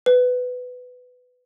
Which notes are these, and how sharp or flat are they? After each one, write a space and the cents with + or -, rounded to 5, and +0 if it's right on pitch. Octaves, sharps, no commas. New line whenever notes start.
B4 +15